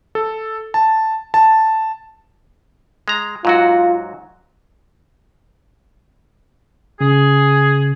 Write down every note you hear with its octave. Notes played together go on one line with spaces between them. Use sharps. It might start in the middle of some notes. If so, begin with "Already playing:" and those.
A4
A5
A5
G#3 A#5
G#2 F#3 F4 F#4
C#3 G#4